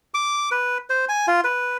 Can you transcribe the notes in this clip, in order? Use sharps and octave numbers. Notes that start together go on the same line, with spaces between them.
D6
B4
C5
G#5
F4
B4